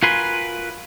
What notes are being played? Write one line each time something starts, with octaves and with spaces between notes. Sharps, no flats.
F4 F#4 A#4 B4 G#5 C6